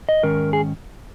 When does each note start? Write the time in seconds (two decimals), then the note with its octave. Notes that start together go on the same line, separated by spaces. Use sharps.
0.09 D#5
0.23 G#2 D#3 G#3 C#4 A#4
0.53 G#4